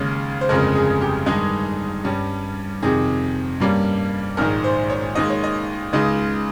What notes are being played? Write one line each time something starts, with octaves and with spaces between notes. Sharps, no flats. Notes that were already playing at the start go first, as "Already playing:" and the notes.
Already playing: D#2 C#3 G#3 C#4
C5
G1 F2 C#3 G#3 A#4
G#4
G4
G2 D#3 G#3 D#4 G#4
G2 G3 C#4
F2 C3 D#3 G#4
G2 G3 A#3 C#4
A#1 G#2 D#3 G#3 A#4
C5
C#5
D#2 D#3 G#3 D#5
C#5
D#5
C#2 C#3 G#3 D#4